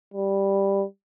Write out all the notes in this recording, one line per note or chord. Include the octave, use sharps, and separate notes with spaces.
G3